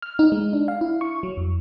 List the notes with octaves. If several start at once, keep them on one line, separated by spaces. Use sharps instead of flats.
F6
D#4
G#3
D4
F5
E4
C#6
F#3
F2